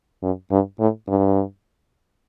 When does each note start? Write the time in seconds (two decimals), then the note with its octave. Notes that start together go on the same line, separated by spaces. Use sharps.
0.23 F#2
0.51 G2
0.80 A2
1.08 G2